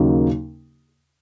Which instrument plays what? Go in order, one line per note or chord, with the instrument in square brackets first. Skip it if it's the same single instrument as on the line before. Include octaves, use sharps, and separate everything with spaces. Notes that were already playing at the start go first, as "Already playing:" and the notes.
Already playing: [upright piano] D#2 C#3 F#3 A#3 D#4